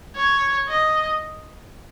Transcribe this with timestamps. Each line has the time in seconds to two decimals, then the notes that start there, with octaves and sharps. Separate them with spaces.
0.16 C#5
0.69 D#5